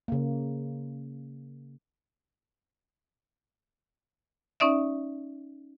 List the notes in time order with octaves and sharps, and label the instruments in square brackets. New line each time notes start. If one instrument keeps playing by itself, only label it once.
[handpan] C#3 A#3
[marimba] C#4 D#4 D5 E5